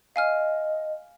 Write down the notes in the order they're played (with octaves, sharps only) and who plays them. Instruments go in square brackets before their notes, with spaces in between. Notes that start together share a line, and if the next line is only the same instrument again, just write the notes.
[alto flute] D#5 [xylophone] F5 G#5 F6